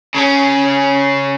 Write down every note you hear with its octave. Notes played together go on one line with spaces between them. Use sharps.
C#3 C#4